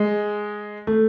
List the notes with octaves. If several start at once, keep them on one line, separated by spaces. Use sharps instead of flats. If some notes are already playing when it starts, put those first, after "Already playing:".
Already playing: G#3
A3